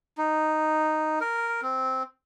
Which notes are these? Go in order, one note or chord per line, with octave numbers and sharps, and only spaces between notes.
D#4
A#4
C4